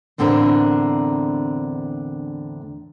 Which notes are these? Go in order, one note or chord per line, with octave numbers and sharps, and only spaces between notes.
E2 A2 D3 C4 D4 A#4